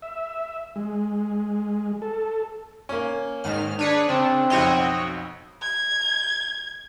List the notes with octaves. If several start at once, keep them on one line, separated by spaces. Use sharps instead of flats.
E5
G#3
A4
A#3 C#4
G#2 D#3 F6
D4 G#4 B4 C#5
C#3 C4 D4
B1 F2 F#4 C#5 D#5
G#6